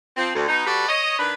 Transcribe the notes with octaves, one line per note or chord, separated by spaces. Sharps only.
F3 C4
D2
B2 D#4
G3 F#4 A4 B4 D5
C#5 D#5
D#3 D4 B4